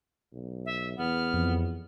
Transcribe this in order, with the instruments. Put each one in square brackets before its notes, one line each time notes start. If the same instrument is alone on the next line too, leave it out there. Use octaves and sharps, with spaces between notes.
[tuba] B1
[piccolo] E5
[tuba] E2 [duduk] B3 [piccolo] F6
[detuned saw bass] F2